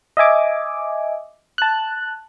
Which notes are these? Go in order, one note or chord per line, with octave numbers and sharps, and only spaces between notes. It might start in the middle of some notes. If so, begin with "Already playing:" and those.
D#5 E5 G#5 D6
A5 F#6